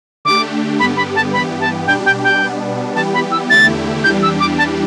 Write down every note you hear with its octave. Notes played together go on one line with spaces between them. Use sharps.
D3 A3 D4 G4 D6
G2 D3 G3 B3 G4 B5
B5
A5
G2 E3 B3 G4 B5
A5
B2 G3 D4 G4 G5
G5
G5
B2 G3 B3 D4
E3 G3 B3 G4 A5
B5
E6
E2 D3 A3 E4 G4 A6
E2 E3 G3 D4 G4 G6
E6
D6
A5